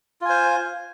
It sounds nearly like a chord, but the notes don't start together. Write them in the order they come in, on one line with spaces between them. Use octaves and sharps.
F4 G#5 C5